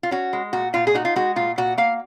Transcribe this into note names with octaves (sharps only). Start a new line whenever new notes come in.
F4
C#4 F#4
G#3
A#2 F#4
A#2 F4
G#4
D#4 F#4
F4
G#3 F#4
A#2 F4
A#2 F#4
A#3 F5